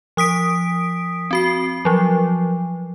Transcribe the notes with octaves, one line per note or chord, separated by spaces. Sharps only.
F3 D#6 B6 D7
C4 F#4 C7
F3 F#3